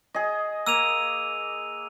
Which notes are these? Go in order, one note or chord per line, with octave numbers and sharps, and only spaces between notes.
G#4 D#5
A#3 E6 D#7 F7